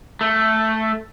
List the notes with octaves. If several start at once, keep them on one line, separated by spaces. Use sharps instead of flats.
A3